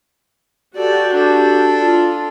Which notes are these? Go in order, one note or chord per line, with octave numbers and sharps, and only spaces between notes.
F#4 G4 A4 D5
D4 A4
F4